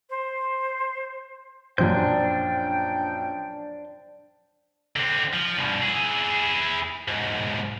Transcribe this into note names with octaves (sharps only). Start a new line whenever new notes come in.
C5
A#1 F#2 D4 C5 G5 G6
D3 C4
F3
G2 B2
E4 G#4
B1 G#2